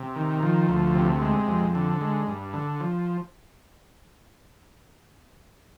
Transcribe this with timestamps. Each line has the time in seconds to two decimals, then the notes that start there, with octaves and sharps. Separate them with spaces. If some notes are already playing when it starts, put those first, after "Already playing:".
Already playing: C3
0.16 D#3
0.43 F3
0.69 D2
0.95 C3
1.21 G#3
1.48 F2
1.75 D3
2.01 G#3
2.27 G2
2.54 D3
2.80 F3